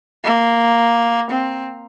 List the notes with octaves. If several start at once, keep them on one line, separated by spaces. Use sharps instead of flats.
A#3
C4